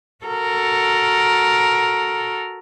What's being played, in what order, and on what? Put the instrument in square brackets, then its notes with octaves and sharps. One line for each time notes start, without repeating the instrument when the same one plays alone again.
[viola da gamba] F#4 A4 A#4